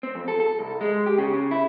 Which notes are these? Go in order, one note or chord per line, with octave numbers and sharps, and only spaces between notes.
C4
F2
A4
A4
C2
G#3
G4
C#3
C#3
E4